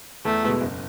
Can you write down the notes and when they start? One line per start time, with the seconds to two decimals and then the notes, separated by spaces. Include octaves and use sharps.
0.25 E2 A3
0.43 B2 G#3 B3 E4
0.61 F#1